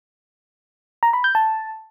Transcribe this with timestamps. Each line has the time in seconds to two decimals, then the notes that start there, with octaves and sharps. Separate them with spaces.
1.03 A#5
1.13 B5
1.24 G6
1.35 A5